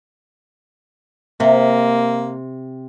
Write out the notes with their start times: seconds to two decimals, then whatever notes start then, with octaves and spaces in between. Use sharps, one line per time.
1.40 C3 A#3